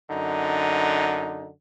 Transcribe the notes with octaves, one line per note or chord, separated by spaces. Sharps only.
F#2 D3 D#4